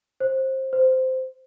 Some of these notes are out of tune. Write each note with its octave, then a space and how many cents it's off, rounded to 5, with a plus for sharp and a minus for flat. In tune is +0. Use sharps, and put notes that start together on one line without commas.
C5 +20
C5 -10